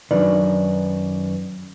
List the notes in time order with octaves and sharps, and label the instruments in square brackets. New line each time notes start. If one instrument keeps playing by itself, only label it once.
[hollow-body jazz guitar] F#2 D#3 [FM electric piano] F#3 B4 [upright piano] D4